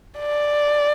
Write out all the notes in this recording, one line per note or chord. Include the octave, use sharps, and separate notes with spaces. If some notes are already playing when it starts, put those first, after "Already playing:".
D5